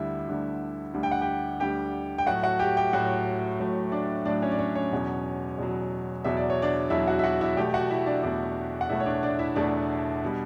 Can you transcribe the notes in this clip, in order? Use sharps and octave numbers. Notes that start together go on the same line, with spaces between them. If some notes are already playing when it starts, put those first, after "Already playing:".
Already playing: D2 D3 G3 E4 E5
D2 D3 G3
D2 D3 G3
G5
F#5
G4 G5
D2 D3 G3 G4 G5
G5
A2 F#3 A3 F#4 F#5
F#4 F#5
G4 G5
G4 G5
A2 F#3 A3 F#4 F#5
A2 F#3 A3
D4 D5
A2 F#3 A3 D4 D5
C#4 C#5
D5
C#4 C#5
C#4 C#5
E2 B2 F#3
E2 B2 F#3
E2 B2 F#3 E5
D5
C#5
D4 D5
E2 B2 F#3 E4 E5
F#4 F#5
E5
F#4 F#5
E4 E5
E2 B2 A3 G4 G5
F#4 F#5
E4 E5
D4 D5
E2 B2 A3 D4 D5
F#5
E2 B2 A3 E4 E5
C#5
D4 D5
D4 D5
E4 E5
E2 B2 A3 D4 D5
B2 G3